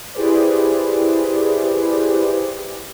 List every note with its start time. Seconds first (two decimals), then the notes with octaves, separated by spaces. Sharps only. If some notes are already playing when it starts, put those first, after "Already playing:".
0.14 E4 G4 G#4 B4 C5 D5